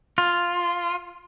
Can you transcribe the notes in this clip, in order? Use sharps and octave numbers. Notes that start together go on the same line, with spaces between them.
F4